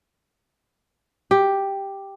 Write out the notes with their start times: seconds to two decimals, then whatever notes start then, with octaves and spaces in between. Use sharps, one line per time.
1.31 G4